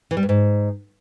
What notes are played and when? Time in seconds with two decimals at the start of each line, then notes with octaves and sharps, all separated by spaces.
0.11 E3
0.17 G3
0.23 G2
0.29 G#2